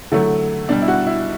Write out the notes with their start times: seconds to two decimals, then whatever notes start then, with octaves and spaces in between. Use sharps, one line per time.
0.12 D3 F#3 A3 E4
0.69 B2 G3 D4
0.82 E4
0.88 F#4
1.07 E4